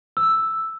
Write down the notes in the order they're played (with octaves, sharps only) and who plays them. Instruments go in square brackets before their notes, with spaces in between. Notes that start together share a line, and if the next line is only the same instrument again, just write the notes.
[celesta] E6